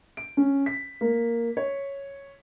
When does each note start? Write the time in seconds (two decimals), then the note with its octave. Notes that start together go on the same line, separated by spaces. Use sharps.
0.17 D7
0.37 C#4
0.66 B6
1.01 A#3
1.57 C#5